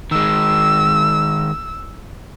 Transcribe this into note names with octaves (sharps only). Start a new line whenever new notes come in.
D#3 G#3 E6